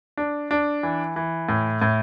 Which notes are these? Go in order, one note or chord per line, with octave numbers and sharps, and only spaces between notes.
D4
D4
E3
E3
A2
A2